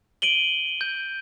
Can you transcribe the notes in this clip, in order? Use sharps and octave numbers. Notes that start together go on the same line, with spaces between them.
D7 D#7 F#7 G7
G6